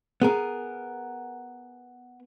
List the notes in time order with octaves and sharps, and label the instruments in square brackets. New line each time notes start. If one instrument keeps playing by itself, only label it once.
[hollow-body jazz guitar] B3 G#4 A#4